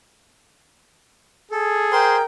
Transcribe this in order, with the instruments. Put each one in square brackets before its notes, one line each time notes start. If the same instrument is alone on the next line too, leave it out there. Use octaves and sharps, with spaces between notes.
[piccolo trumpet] G#4 [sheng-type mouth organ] A4
[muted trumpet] A#4 [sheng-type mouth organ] C5 C6 [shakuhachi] G5